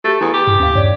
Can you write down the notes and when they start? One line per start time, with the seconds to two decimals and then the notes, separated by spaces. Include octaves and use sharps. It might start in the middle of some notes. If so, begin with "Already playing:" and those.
0.04 A3 F#4 G4
0.21 E2 E4 D#6
0.33 G4
0.47 G2
0.60 D#2 C#4 F5
0.75 G2 C#5 D5